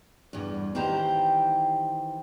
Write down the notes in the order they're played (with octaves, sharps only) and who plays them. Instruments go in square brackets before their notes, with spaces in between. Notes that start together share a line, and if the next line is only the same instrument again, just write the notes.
[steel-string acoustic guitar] E2 G2
D#3 E3 G4 C5 G5 A#5